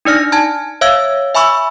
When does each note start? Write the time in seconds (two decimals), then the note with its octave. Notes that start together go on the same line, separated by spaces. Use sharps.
0.05 D4 D#4 D5 F6 A#6
0.32 G#5 A5 G#6
0.81 C#5 E5 F5 E6 G#6
1.35 E5 G#5 B5 C#6 E6